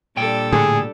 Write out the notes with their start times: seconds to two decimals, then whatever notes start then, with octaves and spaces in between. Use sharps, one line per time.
0.17 A#2 G3 D4 A4 G5
0.52 A2 D3 G#4